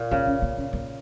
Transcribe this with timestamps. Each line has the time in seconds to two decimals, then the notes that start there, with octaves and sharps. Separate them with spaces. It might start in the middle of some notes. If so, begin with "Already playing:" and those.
Already playing: A#2
0.11 C#3 A#3
0.27 C#4
0.42 A#3
0.58 C#4
0.73 A#3